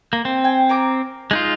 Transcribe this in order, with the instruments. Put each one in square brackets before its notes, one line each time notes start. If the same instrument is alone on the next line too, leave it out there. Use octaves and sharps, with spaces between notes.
[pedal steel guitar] A#3
C4
[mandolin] G5 G#5
A#4 G#5 D6
[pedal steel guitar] G#3 D#4 F4